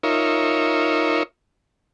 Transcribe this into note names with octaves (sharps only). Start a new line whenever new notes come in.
D#4 F4 A#4 C#5 E5